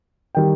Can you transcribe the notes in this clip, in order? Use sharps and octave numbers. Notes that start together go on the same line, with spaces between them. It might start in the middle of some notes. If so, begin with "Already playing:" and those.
D#3 G3 G5